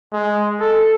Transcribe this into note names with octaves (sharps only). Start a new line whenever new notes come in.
G#3
A4